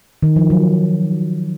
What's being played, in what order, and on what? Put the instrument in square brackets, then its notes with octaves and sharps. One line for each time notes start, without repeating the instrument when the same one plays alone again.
[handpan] D#3
F3
F#3